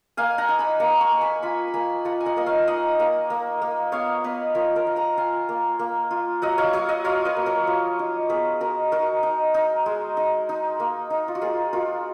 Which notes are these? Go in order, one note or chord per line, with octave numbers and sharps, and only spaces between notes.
A#3 F5 G#5
F#5 A#5
D#4
G#5 B5
A#3 F#5 A#5
A#5 C#6
A#3
G#5 B5
F4 G#5 B5
C#6
A#3 G#5 B5
F4 F#5 A#5
G#5
D#5 F#5
A#3 D#5
C#5 F5
D#4 D#5 F#5
A#3
A#3
A#3
B3 C#5 F5
B3 B4 D#5
F3 A#4 C#5
A#4 C#5
F3
F#5 A#5
F4 F5 G#5
A#3
A#3
F4
F#3 D#5 F#5
C#5 F5
F#3 C#5 F5
D#5 F#5
F4 C#5 F5
B4 D#5
A#3
A#4 C#5
F3
D#4
B3 G#4 B4
D#4 F#4 A#4
D#4 F#4 A#4
D#4
D#4
G#3
D#4
D#4
A#3
D#4
F4
F#4
A#3 F4 G#4
F4 F#4 A#4